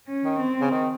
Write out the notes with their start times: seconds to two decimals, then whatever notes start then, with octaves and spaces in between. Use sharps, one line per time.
0.09 C#4
0.24 D#3
0.40 C4
0.61 C#3
0.71 D#3